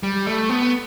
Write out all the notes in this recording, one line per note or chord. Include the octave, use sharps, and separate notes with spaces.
G3
A3
B3